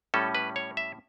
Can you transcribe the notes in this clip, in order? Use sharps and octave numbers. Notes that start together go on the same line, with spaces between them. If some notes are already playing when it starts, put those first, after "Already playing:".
A2 G3 C#4 A4
B4
C#5
E5